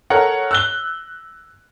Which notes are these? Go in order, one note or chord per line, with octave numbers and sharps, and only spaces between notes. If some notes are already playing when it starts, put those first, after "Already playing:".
A4 A#4 C#5 F#5
E6 F#6 G7